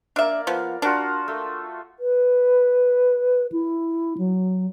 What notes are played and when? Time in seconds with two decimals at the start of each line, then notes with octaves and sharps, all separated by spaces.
0.16 A#3 D4 D5 E5 F5
0.47 F3 B3
0.82 D4 F4 F#4 A#4
1.28 A3
2.00 B4
3.52 E4
4.18 F#3